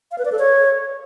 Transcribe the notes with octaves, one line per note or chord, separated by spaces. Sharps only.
F5
B4
D5
A4
C#5